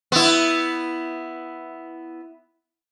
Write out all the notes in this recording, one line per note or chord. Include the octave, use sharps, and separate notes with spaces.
B3 E4